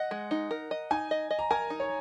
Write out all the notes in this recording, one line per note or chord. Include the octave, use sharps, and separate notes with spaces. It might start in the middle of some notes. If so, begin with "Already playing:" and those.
Already playing: D#5 F#5
G#3
D#4
A#4
D#5
D#4 G#5
D#5
D#5
A#5
A#4 G#5
D#4
C#5